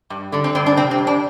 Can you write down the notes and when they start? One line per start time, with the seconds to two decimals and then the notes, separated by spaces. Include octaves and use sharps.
0.10 G2
0.32 D3 D4
0.44 C4
0.55 G2 C4
0.66 D4
0.76 C3 C4
0.91 C4
0.98 F2
1.07 D4